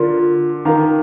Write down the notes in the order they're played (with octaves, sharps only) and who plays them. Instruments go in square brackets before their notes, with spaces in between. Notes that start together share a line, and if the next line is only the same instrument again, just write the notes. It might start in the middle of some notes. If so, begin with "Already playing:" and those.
Already playing: [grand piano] D3 [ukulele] F4 A#4 D5
[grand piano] D#3 [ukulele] A#4 F5 A#5